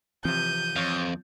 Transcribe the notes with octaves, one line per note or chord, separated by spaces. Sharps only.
C3 E3 F3 C4 G6 D#7
F2 C#5 F5